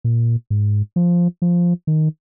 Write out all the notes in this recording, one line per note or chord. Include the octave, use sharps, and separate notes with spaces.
A#2
G#2
F3
F3
D#3